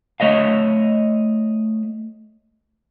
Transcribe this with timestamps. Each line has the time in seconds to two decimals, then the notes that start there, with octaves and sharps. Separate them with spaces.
0.20 A3 C#5 D#5 F5